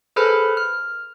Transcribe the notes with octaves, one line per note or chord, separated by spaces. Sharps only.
G#4 A4 B4 C5 B5 F6
F6